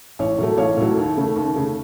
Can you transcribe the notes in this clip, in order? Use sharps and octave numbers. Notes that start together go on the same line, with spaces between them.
A1 C#5
A2 F#3 A3
A1 C#5 F5
A2 F#3 A3
D#2
C#3 A3
D#2
C#3 A3